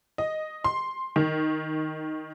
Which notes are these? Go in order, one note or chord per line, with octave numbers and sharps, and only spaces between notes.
D#5
C6
D#3